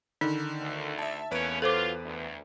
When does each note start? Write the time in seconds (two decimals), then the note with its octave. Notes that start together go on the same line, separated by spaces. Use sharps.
0.21 D3 D#3 D#4
0.61 D2
0.98 E5 A5
1.31 E2 A3 A#3 C#4 B4 D7
1.62 F#3 F4 A4 C5 D6
2.05 D2